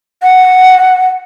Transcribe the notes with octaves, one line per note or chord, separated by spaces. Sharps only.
F#5